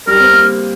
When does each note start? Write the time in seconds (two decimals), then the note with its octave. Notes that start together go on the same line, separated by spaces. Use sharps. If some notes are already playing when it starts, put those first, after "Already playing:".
0.07 G3 A#4
0.20 C4
0.32 A#3